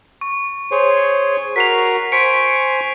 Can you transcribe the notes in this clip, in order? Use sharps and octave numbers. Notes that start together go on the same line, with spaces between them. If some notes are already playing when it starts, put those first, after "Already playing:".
C#6
G#4 C5 C#5
F#4 A#4 B6 C7 F7
C5 G#5 C#6 B6 C#7 D7